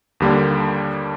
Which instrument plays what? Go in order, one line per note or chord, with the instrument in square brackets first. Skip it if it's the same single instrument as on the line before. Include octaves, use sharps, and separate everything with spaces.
[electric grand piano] D#2 D3 G3 A#3 D4